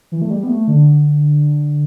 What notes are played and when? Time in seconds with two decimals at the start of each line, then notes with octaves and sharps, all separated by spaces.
0.12 E3
0.22 A3
0.30 G3
0.43 B3
0.48 A3
0.68 D3